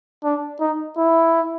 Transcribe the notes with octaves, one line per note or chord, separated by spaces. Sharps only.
D4
D#4
E4